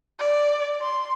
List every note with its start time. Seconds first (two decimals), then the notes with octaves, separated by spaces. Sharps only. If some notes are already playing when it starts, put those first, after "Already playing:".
0.20 D5
0.82 C6